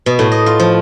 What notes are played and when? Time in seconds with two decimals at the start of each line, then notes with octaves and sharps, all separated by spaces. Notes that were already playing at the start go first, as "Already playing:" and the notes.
0.06 B2
0.19 A2
0.32 D#5
0.46 F4
0.60 F3